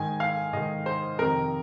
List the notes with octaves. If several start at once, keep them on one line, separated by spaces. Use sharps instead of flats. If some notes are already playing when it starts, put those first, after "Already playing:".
Already playing: G#2 D#3 G#5
F5
G#2 D#3 D#5
C5
F2 C3 D#3 A#4